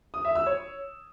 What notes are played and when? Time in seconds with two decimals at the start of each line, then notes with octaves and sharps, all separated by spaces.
0.14 D#6
0.25 E5
0.35 E6
0.46 C#5